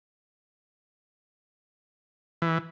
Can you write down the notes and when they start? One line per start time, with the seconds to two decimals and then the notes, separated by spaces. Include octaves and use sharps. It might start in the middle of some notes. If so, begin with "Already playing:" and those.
2.42 E3